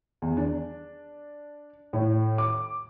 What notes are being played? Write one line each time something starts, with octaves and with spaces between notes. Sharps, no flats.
E2
D4
A2
D6